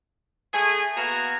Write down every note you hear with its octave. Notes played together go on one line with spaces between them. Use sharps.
A3 G#4
A#3 B3 F#4 G#5 A#5